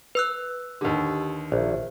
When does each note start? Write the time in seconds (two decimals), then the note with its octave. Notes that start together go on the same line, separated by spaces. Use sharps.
0.15 B4 E6 F#6
0.81 D#2 D3 G4
1.52 A#1 C5 E5